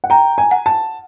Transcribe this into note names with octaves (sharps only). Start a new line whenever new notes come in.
F#5
G5 A#5
G#5
F#5
A5